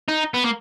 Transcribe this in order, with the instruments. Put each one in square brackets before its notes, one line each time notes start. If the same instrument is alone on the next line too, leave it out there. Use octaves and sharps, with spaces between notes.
[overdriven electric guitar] D#4
B3
A#3